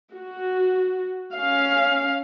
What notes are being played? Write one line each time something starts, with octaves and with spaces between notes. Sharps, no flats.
F#4
C#4 F5